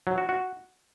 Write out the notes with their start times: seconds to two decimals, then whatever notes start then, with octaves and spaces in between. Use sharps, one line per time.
0.07 F#3
0.18 F#4
0.29 F#4